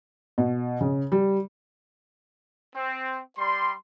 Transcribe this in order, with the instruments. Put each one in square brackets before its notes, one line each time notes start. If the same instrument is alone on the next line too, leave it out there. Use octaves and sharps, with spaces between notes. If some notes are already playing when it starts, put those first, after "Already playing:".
[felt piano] B2
C#3
G3
[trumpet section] C4
G3 C6